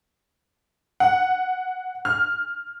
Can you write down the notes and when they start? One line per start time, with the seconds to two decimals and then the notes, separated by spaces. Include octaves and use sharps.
1.00 F#5
2.05 F6